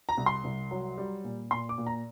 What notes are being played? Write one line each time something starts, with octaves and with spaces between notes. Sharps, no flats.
A#5
C2
C6
C2
F#3
G3
A#2
A#2 C6
D6
A#2
A#5